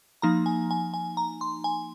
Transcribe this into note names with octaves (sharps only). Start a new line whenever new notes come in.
F3 A#3 D#4 A#5
G#5
G#5
G#5
A#5
C6
G#5